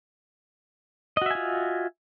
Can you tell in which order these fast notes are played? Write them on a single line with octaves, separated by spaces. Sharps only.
D#5 F#4 E5 G#5 F4